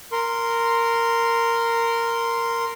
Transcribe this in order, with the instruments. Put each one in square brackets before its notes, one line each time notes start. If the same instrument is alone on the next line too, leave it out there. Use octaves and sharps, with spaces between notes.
[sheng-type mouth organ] A#4 C6